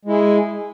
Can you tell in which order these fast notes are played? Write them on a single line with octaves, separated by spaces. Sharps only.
G#3 E4 G#4